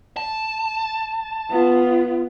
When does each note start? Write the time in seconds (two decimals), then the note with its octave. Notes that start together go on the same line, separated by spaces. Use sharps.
0.17 A5
1.51 B3 F4